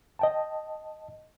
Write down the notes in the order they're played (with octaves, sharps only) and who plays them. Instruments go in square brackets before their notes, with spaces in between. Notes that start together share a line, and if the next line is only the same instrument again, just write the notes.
[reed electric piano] D#5 G5 A5